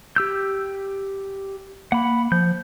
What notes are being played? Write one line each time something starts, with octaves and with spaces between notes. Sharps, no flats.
G4 E6 G6
A#3 F#5 B5
F3 G6